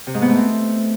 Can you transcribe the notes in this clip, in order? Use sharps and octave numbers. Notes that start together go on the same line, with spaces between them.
C3
G#2
B3
A3
C4